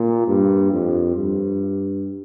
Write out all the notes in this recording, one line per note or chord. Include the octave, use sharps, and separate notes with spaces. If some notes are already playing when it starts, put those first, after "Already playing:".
Already playing: A#2
G2
F2
G2